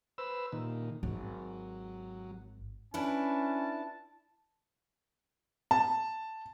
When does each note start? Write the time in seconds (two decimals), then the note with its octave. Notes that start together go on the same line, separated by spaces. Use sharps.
0.18 B4 C5 E6
0.52 A#2 D#3
1.03 G#1 F#3
2.94 C#4 D4 E4 B4 A5
5.71 A5